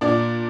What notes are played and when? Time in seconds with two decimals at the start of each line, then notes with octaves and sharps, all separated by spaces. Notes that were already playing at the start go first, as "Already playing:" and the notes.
0.01 A#2 D4 D5